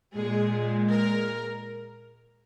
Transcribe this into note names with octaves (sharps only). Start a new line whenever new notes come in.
A#2 G#3 G#4
A#4